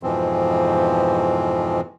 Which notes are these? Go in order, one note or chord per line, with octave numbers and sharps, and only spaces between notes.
F2 G#2 B2 E3 F3 C4